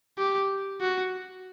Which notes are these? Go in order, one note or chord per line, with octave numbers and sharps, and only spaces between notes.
G4
F#4